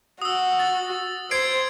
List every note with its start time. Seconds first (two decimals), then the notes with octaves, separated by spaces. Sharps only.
0.22 F#4 D#6 E6
0.59 A6
1.31 C5 G#6 C7 D7